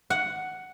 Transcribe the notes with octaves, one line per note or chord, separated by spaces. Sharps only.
F#5